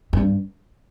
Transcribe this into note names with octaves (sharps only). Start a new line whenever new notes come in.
G2